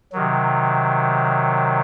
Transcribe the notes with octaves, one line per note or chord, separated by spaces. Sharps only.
C3 D#3 F#3